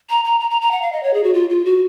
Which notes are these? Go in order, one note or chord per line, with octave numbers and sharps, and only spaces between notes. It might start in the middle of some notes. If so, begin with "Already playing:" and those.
A#5
A#5
A#5
A#5
A#5
F#5
F5
D#5
C#5
G#4
F#4
F4
F4
F#4